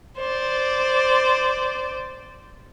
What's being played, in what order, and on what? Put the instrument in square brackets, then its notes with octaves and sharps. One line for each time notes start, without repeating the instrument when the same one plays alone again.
[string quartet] C5 D5